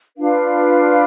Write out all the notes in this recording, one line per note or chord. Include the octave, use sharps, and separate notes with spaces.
D4 F4 B4 F5